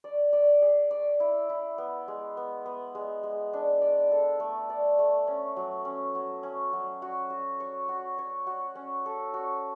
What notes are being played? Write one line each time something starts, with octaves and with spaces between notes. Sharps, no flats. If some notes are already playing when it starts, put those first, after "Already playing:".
D5
D5
G#4
D5
E4
E4
B3
G#3
B3
B3
G#3
G#3
D4
D5
A4
A3
D5
A3
C#4
F#3
C#4
F#3
C#4
F#3
F#4
F#4
C#5
F#4
C#5
F#4
C#4
A4
F#4